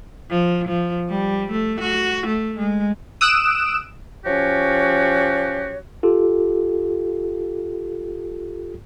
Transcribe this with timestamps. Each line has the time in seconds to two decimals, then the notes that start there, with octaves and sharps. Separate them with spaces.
0.30 F3
0.68 F3
1.09 G3
1.51 A3
1.80 F#4
2.27 A3
2.57 G#3
3.21 D#6 E6 F#6 D7 E7
4.26 F3 C#4 F#4 G4 C#5
6.03 F4 G4 A4